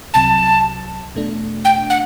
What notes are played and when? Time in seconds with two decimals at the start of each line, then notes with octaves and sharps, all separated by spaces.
0.14 C2 C3 F#3 A5
1.15 E2 B2 A3 D4
1.65 G5
1.90 F#5